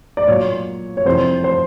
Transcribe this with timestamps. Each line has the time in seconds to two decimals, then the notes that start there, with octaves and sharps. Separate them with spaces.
0.17 D5
0.28 A#2 F#3 C#5
0.97 C#5
1.05 F2 C3 E3 G3 C5
1.44 C5